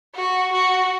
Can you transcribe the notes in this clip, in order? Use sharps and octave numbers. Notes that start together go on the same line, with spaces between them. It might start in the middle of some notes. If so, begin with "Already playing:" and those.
F#4
F#4